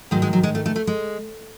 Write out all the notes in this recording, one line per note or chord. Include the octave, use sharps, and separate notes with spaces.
G#2 D#3 F#3 G#3
G#3
F#3
G#3
A3
A3
A3
G#3